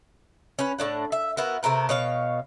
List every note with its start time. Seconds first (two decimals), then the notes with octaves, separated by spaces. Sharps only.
0.59 C#4 B4
0.79 A2 D4 F#5
1.12 E5
1.37 B3 E4 F#4 A#4
1.63 C3 A3 A#4 B4
1.89 B2 C#5 F5